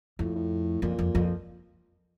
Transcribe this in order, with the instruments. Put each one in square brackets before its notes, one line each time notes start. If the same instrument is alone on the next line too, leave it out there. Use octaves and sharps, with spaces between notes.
[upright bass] F2 [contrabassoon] A2
[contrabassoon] A2
[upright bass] F2 [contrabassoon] A#2
[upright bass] F2
F2